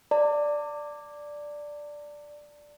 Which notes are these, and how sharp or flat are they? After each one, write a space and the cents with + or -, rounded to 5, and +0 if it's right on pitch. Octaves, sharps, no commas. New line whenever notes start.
D5 +0 A5 +45